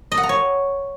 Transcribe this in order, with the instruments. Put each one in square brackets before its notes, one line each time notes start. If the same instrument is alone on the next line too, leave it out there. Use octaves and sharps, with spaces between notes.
[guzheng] D#5
F#5
A#5
C#5